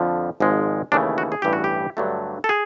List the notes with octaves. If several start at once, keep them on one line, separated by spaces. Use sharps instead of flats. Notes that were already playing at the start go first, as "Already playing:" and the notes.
Already playing: F2 D3 F3
G#1 G#2 F3 G#3
D#2 C#3 E3 A3 D4
F#4
G#4
A1 G2 E3 G4
F#4
G4
G2 D3 F#3 A3
A4
G#4